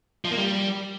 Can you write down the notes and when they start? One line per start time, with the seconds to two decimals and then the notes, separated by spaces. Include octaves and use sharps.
0.25 F3
0.31 A#3
0.38 G3